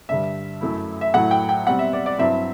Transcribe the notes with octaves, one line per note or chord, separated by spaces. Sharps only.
G2 D3 G3 E5
F#2 F#3 A3 E4
E5
A2 F#3 A3 E4 F#5
G5
G5
B2 G3 C4 F#5
E5
D5
D5
G2 F#3 C4 E4 E5